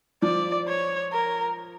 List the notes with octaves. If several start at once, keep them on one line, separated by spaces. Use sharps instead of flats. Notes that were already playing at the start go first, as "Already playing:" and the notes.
F3 D5
C#5
A#4